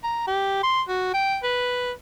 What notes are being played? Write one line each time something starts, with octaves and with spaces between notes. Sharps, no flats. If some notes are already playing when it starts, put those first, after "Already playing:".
A#5
G4
C6
F#4
G5
B4